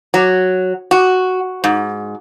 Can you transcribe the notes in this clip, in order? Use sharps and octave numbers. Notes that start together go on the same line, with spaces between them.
F#3
F#4
G#2